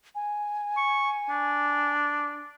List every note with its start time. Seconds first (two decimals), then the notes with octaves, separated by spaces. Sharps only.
0.15 G#5
0.77 C#6
1.30 D4